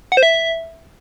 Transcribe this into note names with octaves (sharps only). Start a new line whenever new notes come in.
F#5
C5
E5